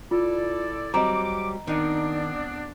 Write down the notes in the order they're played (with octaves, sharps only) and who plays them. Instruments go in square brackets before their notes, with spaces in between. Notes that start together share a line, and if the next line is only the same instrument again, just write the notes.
[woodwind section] E4 A4 D5 [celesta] F4
[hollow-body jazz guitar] F#3 G3 C4 [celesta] D#5 A#5 [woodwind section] D6
[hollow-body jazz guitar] D#3 D#4 [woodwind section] B3 C4 D4